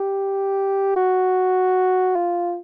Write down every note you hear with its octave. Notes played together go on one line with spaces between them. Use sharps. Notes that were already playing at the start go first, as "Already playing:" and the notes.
Already playing: G4
F#4
F4